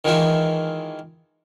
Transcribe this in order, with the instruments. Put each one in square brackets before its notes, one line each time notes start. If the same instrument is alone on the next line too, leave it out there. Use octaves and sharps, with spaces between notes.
[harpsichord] D#3 E3 G#3 F4 E5